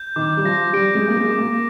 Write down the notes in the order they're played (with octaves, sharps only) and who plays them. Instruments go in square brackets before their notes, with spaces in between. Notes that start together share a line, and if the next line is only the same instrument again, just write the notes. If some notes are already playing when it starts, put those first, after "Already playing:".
Already playing: [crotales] G6
[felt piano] D#3 [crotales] D6
[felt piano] G3
[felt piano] F3 [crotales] A#6
[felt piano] G3 [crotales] D7
[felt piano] G#3
[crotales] G6
[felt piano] A#3
G#3
[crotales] D6
[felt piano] A#3